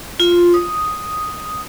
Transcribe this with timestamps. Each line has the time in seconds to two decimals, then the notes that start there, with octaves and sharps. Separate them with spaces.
0.20 F4
0.54 D#6